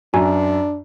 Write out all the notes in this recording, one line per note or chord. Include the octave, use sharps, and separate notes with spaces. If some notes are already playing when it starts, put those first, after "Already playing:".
F#2 D4 F#4 G#5